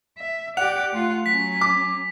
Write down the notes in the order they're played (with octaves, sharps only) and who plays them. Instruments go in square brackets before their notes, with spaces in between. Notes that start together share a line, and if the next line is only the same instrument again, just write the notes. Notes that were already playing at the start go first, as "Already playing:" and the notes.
[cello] E5
[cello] G4 D5 [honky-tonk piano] F#5 [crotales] F7
[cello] A3 F4
[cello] F#3 C#4 [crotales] B6
[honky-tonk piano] D6